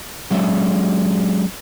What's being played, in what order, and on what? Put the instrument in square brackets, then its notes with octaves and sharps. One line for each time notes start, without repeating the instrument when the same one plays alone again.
[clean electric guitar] F#3 G#3 C#4 D4 F4 E5